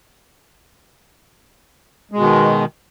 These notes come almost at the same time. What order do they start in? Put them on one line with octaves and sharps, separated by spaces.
G#3 B2 D#3